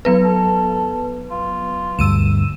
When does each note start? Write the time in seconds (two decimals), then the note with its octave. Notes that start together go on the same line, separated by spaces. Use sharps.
0.05 F#3 B3 B4
0.24 A4
1.31 F4
1.99 D2 G2 E6 D#7 E7